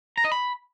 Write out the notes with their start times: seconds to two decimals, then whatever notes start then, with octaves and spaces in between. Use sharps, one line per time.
0.18 A#5
0.25 D#5
0.32 B5